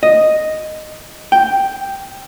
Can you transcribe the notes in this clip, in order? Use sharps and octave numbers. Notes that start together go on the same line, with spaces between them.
D#5
G5